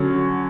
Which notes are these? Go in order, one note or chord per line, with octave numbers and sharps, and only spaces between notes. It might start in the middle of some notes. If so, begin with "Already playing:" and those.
Already playing: D3 F#3 C#4